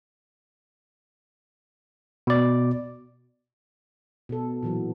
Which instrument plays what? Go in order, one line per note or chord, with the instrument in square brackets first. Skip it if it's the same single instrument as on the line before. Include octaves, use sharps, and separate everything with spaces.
[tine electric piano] B2 D5
[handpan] B2 A4
A#2 E3 F#3